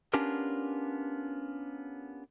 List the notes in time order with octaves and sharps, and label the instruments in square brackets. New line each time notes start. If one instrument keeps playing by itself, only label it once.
[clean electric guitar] B3 C#4 D4 F4 G4 A#4